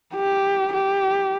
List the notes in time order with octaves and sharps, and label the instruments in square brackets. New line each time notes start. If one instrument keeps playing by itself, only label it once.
[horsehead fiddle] G4
G4